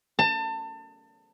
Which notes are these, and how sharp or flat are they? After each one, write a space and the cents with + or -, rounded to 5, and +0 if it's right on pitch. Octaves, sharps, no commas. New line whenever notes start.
A5 +30